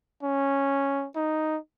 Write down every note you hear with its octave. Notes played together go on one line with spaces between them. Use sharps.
C#4
D#4